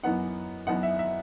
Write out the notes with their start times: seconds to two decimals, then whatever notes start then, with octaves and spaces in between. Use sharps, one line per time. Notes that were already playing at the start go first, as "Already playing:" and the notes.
0.03 F#2 E3 B3 D#4 F#5
0.67 F#2 E3 B3 D#4 F#5
0.83 E5
0.99 E5